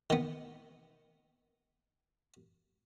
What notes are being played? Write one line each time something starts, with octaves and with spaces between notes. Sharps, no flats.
D#3 B3